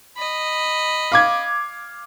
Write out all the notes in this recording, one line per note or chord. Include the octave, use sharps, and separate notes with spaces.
D#5 B5
F5 D6 G#6